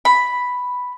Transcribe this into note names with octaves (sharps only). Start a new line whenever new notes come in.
B5